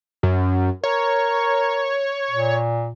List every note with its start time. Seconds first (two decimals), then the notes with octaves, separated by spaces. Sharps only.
0.23 F#2
0.84 A#4 C#5
2.31 A#2